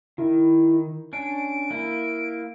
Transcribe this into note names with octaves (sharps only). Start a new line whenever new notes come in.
D#3 E4
C#4 D4 D7
A#3 E4